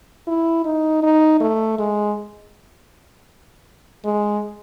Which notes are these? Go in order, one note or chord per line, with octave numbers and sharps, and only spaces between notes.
E4
D#4
D#4
A3
G#3
G#3